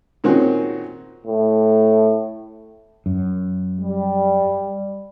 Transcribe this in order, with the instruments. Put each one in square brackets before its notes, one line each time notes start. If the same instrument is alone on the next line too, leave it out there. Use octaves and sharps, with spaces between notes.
[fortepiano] A#2 D#3 C4 C#4 F#4 G#4
[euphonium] A2
[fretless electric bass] F#2
[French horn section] G3